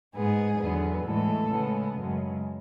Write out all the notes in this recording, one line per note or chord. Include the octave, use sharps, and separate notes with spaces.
G#2 G#3 B3 G#4
E2 D3 F#3 B3
A2 E3 G#3 A4
C#3 G#3 B3
F#2 C#3 G#3